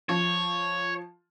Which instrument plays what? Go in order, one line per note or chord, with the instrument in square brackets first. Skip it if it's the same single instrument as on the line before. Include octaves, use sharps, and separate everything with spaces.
[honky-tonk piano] F3 [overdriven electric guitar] C#5